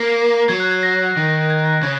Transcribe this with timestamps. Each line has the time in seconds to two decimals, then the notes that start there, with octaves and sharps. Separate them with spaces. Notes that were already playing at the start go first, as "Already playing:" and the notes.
Already playing: A#3 C7
0.49 F#3 G#6
0.60 F#6
0.71 G#6
0.83 A#6
1.17 D#3
1.50 G#6
1.66 F#6
1.83 C#3 G#6